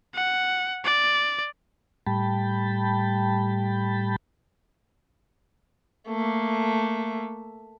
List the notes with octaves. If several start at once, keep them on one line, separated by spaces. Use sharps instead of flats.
F#5
D5
A2 G3 G5 A5 B5
A3 A#3